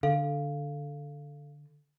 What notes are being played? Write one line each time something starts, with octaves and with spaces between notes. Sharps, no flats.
D3 A4 F5